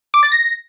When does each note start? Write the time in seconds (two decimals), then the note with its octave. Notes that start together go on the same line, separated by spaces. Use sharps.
0.14 D6
0.23 A6
0.32 A#6